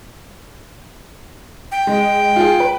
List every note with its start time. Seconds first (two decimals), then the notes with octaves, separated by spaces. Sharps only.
1.71 G5
1.87 G#3
2.36 F4 G#4
2.60 B4